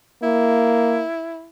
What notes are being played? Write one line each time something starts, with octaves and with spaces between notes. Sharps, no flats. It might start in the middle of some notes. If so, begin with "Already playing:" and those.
A#3 E4